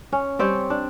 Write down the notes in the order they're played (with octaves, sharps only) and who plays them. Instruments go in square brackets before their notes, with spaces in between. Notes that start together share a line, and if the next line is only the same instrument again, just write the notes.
[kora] C#4
G3 C4 G4 C#5
D4